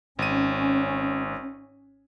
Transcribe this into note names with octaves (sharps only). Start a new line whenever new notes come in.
G#1 C#4 D#7